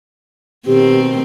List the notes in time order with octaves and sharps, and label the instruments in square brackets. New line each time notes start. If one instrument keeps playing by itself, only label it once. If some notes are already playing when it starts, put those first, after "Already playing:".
[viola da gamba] B2 D#3 C4 [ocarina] G4